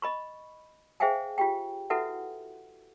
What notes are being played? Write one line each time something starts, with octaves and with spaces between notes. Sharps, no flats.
D#5 B5 C#6
G#4 C5 E5 F5 G5 G#5
F4 G4 G5
E4 F#4 A4 B4 E5 F#5